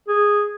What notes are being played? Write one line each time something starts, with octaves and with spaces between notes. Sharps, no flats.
G#4